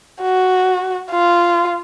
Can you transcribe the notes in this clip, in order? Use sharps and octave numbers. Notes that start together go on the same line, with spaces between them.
F#4
F4